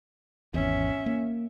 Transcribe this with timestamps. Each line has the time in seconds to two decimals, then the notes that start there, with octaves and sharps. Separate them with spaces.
0.54 G#1 E2 C#4 E5
1.06 A#3